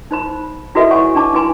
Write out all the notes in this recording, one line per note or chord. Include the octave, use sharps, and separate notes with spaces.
D#4 C5 B5
E4 F#4 A4 B4 D#5 E5
C#5 F#5 G#5 C#6
D4 D#4 A5 D6
D#4 E4 B4 G#5 B5 C6